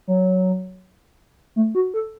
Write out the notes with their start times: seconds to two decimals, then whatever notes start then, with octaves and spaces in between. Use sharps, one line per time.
0.08 F#3
1.56 A3
1.75 F#4
1.94 A4